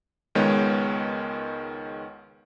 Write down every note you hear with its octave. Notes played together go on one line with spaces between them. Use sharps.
C#2 D#3 G#3 B3 C#5